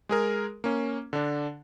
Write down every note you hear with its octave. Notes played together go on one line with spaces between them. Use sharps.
G#3 G#4 A#4
A#3 C#4
D3 D4